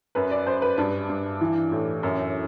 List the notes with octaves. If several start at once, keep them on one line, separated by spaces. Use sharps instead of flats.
F#2 B4
D5
F#2 C5
B4
G2 D4
G2
E3
A2
F#2